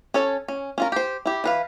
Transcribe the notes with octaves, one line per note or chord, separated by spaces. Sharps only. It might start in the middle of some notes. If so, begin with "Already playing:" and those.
C#4 A4 C#5
C#4
C#4 F4 A#4
G4 C5
E4 G4
E3 B4 F5